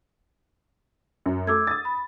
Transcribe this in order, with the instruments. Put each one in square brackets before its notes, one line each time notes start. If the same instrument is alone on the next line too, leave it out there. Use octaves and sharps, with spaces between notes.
[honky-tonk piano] F#2
[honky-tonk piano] A3 [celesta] D6 E6 G#6
[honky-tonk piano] D#6 A6
[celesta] B5